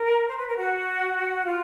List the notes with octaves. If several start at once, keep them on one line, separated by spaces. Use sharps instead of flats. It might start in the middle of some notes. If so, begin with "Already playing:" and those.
Already playing: A#4
C5
B4
A#4
F#4
F4